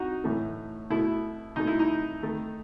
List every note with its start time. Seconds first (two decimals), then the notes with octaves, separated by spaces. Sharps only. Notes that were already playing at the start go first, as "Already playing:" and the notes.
Already playing: D#4 F#4
0.24 A2 E3 A3
0.90 B2 A3 E4
1.56 B2 A3 D#4
1.67 E4
1.79 D#4
2.23 D#3 A3